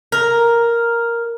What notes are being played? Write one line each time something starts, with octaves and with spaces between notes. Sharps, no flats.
A#4